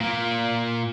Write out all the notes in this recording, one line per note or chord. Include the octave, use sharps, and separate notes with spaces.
A#2 A#3